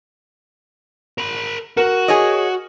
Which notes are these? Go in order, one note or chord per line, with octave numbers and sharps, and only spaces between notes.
A#4 B5
F#4 A#4
G#4 C#5 D#5